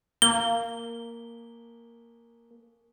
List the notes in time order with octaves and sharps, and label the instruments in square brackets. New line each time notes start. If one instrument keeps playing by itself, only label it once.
[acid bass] A#3 [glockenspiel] G7